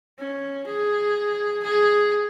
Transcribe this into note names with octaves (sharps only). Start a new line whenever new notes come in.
C#4
G#4
G#4